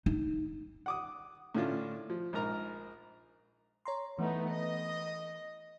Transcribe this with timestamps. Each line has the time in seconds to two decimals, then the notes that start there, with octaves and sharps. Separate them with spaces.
0.06 D#4
0.86 F#5 D6 D#6
1.55 A2 D3 C#4 D4 F4
2.10 F3
2.33 A#1 G#2 A#4 A#5
3.85 C#5 A#5 C6
4.19 E3 A3 B3 D#4
4.48 D#5